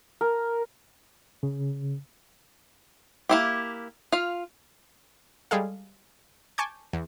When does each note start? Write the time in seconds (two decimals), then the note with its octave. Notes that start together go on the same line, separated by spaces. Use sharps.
0.21 A#4
1.43 C#3
3.29 A#3 E4 G4
4.12 F4 F5
5.51 G3 G#3 G#4 A4 F5
6.58 G#5 A5 C#6 D6 G6
6.93 E2